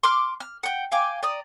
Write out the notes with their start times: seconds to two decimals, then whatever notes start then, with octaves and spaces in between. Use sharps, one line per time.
0.03 C6 D6 F6
0.40 F6
0.63 F#5 G5
0.92 F5 G5 G#5 D6
1.23 D5 A#5 D#6